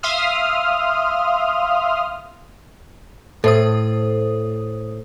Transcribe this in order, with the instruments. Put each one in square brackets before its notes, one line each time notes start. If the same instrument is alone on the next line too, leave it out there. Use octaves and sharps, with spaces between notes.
[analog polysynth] E5 F5 C6 D#6 F6
[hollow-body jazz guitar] A2 [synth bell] A4 C5 D#6